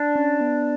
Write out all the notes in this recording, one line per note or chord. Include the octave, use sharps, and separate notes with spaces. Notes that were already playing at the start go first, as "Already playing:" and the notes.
Already playing: D4
C#4
B3